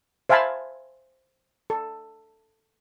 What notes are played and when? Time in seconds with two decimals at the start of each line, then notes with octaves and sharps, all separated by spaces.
0.29 C5 E5 F5 G#5 A5 B5
1.70 A4